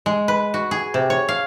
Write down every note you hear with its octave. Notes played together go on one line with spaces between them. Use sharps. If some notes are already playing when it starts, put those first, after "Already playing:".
G#3
B4
F#4
G#4
C3
C#5
F5